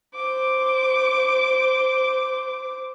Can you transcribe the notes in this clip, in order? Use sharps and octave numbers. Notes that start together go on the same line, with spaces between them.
C5 D6